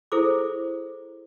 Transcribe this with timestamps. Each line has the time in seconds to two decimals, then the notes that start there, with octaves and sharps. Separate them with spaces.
0.12 E4 G#4 A4 C5 D6